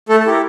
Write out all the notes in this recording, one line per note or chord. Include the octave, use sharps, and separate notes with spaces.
A3 A4
A4
E4 G4 A#4